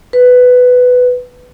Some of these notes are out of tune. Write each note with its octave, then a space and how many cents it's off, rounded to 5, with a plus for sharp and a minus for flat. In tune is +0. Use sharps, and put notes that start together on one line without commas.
B4 +10